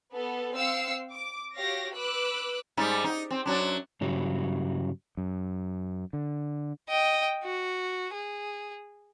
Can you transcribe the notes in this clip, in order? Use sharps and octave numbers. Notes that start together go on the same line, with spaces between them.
B3 A4
C4 F5 E6 C7 C#7
D6
F#4 G4 C#5 F5 A#6
B4 D6 E6 F#6
G#2 G3 D#4
D#4
C4
F#2 F#3 D4
G2 C#3 F#3 G3
F#2
D3
D#5 G5
F#4
G#4